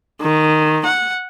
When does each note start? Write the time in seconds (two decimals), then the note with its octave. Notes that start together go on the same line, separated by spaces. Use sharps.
0.21 D#3
0.85 F#5